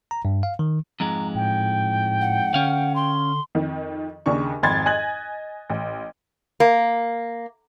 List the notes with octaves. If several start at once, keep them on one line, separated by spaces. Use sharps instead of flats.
A#5
G2
F5
D#3
F2 G#2 G#3 A#5
A2 G5
F#5
D3 C#4 F5
C6
F2 D#3
D#2 C#3 D4 C#6
G#1 F2 B5 C6 G#6 A6
D#5 G#5 F#6 G#6 F#7
A1
A#3